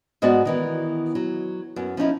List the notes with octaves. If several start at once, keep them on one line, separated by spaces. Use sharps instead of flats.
G#2 G#3 B3 F#4 D5 F#5
D#3 E3 B3
F#3
F#2 B3
F3 C#4 D#4 E4